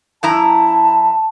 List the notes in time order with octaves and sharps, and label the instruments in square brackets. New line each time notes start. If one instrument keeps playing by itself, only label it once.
[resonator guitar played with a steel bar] F#2 E4 A#5 [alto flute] A5